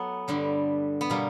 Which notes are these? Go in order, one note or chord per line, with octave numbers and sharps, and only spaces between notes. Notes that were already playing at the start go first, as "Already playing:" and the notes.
Already playing: F#3 A3 B3
G2 D3 G3
B3
B2 G3 A#3